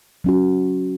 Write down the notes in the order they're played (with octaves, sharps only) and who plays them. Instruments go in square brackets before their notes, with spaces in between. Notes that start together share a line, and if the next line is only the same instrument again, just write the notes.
[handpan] F#3 C#4 F#4